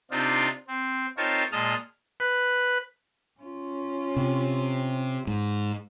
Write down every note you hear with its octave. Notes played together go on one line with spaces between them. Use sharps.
C3 C4 D4 D#4 F4
C4
C4 D#4 F4 A#4 C#5 A5
A#2 G#3 D#5 A5 F6
B4
C#4 F4
C3
G#2